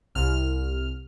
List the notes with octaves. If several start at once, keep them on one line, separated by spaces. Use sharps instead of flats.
C2 F6